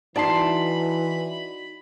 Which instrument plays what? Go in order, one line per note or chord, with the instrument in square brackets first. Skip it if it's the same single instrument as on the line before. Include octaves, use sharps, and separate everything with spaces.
[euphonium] E3 [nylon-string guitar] D#4 F#4 [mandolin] D5 A5 C6 [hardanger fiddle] B5